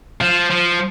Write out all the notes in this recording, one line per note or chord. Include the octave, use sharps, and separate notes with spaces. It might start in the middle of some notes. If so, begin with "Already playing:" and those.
F3
F3